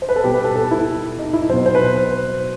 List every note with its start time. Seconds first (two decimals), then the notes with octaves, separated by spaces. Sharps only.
0.02 C5
0.09 B4
0.16 A4
0.24 B2 G3 G4
0.34 B4
0.44 A4
0.56 A4
0.71 E4
1.19 D#4
1.33 E4
1.49 B2 F#3 C5
1.66 C5
1.75 B4